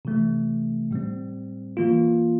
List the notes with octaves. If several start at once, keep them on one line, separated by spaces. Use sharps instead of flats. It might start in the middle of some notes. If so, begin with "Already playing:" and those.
C3 E3 A3
A2 G3 C4
E3 A#3 F4